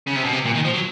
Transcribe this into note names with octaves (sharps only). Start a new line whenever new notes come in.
C#3
C3
B2
C3
A#2
D#3
F3
F#3